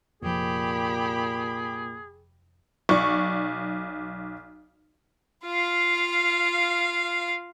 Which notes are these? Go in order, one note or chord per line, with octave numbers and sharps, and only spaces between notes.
F1 A#2 F3 G4 G#4 B5
B1 D5 C#6
F4 F5